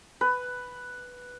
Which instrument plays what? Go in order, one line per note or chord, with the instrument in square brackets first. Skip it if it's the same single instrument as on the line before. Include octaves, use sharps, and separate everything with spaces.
[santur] B4